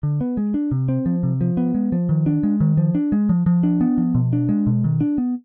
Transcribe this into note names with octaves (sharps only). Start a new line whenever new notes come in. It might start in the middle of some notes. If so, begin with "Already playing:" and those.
D3
B3
G#3
D4
C3
C4
F3
C3
F3
B3
G#3
F3
D#3
D4
G#3
D#3
F3
D4
G#3
F3
F3
D4
B3
F3
B2
D4
G#3
B2
D#3
D4
B3